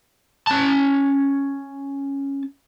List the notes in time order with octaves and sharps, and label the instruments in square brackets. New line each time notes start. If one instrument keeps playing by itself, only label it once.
[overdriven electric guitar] C#4 A5